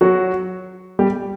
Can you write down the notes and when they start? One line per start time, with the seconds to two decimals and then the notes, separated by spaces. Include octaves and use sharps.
0.01 F#3 F#4
0.99 G3 G4